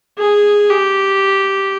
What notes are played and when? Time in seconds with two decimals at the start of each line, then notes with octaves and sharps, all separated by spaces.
0.18 G#4
0.70 G4